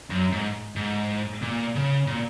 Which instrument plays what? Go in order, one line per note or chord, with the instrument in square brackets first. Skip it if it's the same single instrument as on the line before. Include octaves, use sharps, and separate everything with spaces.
[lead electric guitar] F#2
G#2
G#2
A#2
C#3
A#2